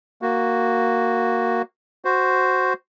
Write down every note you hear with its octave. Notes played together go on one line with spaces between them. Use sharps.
A#3 F#4
F#4 C5